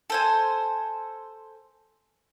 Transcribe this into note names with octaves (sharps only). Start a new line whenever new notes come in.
A4 C5 G#5